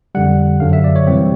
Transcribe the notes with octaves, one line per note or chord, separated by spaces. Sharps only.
F2 D3 G3 F#5
F#2 D3 F#3 F5
E5
D5
C#5
C3 E3 G3 C4 C#5